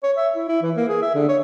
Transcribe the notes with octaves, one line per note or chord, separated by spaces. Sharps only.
C#5
E5
E4
E4
E3
A#3
G#4
E5
D3
C#5